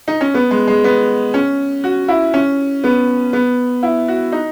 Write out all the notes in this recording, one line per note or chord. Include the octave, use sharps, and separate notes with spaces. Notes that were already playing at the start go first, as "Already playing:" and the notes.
D#4
C#4
B3
G#3
G#3
B3
C#4
F#4
E4
C#4
B3
B3
E4
F#4
D#4